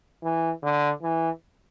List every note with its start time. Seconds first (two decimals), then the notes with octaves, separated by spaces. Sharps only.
0.24 E3
0.63 D3
1.02 E3